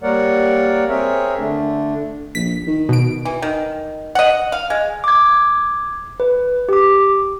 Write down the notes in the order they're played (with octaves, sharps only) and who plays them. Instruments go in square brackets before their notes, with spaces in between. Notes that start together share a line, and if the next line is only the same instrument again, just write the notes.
[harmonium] G3 A#3 A#4 C#5 D5 F#5
C4 G#4 A#4 C#5 E5
D3 A3 D4
[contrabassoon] A#1 [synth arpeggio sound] B6
[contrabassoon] D#3
[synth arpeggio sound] B2 D7
[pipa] E3
D#3
D#5 F#5
F5
G#3
[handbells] D6 G#6
B4
G4 D6